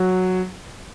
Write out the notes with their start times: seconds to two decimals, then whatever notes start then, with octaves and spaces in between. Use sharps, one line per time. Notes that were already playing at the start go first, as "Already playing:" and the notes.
Already playing: F#3